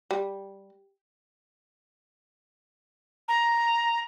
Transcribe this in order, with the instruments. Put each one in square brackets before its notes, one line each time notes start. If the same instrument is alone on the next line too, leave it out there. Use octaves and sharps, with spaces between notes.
[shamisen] G3
[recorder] A#5